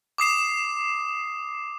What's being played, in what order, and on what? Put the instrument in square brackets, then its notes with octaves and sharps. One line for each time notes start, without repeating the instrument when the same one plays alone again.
[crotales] D6 D#6 C7 E7